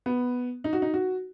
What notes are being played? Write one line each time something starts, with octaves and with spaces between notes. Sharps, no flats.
B3
D#4
F#4
D#4
F#4